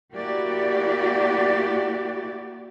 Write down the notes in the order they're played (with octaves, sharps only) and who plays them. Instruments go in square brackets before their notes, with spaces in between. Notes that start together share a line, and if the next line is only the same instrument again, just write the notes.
[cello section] A#3 E4 F#4 G4 D5